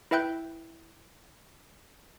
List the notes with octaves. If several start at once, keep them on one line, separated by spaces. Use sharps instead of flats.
E4 B4 E5 G5 F#6 G6